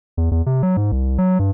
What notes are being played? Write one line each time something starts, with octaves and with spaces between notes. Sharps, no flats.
E2
E2
C3
F#3
G#2
C2
F#3
G2